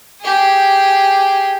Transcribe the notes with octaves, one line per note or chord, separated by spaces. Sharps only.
G4 G#4